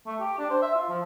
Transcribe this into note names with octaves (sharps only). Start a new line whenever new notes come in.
A3
G4
D4
C5
E5
F4
F3